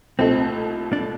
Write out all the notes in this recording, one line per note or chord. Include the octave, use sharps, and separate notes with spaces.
C2 A#2 A3 C4 D#4 A4
D4